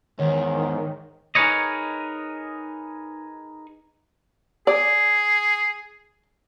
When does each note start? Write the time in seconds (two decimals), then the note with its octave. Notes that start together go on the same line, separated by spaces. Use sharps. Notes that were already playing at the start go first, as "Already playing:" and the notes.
0.19 E2 G#2 D#3 C#5
1.35 D#4 G#4 A#4 B4 C#5 D#5
4.67 G#4 D5